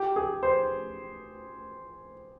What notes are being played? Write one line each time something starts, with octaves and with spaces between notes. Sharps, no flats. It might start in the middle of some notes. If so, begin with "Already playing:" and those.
Already playing: G4
G#4
C5